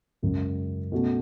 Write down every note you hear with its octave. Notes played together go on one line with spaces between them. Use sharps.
F#2 C#3 G#3
B2 A3 C#4 F#4